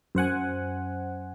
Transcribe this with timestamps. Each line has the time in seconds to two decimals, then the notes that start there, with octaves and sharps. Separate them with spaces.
0.15 F#2 C5 F#5 G#5